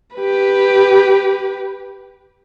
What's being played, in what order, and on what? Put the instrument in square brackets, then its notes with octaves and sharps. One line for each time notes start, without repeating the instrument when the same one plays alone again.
[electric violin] G4 B4